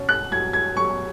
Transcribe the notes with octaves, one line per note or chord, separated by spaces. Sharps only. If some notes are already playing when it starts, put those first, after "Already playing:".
Already playing: B2 C#4
F#6
F#3 G#6
G#6
F#3 C#6